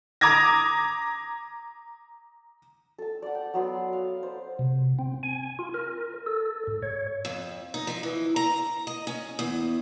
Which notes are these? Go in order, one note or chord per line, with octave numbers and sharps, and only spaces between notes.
A#5 D6 D#6 G#6 A#6
A4 A5
D5 F#5
G5
F#3 B3 C6
F5
C5
C3
C4
G#5
F4
A#4
A4
G#2
C#5
F2
D#4
F3
E3
A#5
D#5
C#4
E2